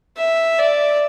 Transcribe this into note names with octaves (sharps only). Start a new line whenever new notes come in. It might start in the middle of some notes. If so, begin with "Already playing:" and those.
E5
D5